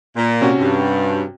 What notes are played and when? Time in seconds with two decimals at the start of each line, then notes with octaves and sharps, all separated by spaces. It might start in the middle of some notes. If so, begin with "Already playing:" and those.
0.17 A#2
0.41 C3 C#4 F#4
0.59 G2